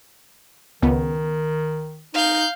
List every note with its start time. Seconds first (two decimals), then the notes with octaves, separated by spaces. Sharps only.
0.82 C#2 D#3 B3
2.14 D#4 F5 G6